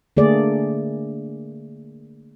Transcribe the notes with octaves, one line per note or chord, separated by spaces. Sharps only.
D3 A3 A#3 G#4 D5